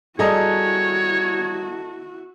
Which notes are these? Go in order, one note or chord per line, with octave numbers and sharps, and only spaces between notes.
G3 E4 F#4 G#4 A4 C#5 D#5 A#5